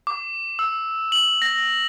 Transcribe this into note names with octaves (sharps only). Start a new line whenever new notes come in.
D6
E6
F#7
A#6